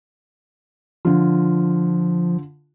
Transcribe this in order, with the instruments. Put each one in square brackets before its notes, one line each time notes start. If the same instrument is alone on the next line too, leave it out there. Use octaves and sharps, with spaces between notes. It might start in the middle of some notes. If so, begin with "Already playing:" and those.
[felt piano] D3 F4 [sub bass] F3